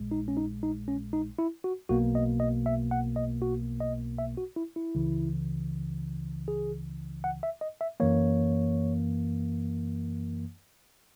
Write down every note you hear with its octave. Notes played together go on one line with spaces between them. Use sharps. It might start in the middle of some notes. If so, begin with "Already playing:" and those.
Already playing: A#1 A#2 G#3
D#4
C#4
D#4
D#4
C#4
D#4
E4
F#4
B1 B2 A#3 F#4
D#5
D#5
E5
F#5
D#5
F#4
D#5
E5
F#4
E4
E4
C#2 C#3 E3
G#4
F#5
E5
D#5
E5
F#2 E3 A#3 C#5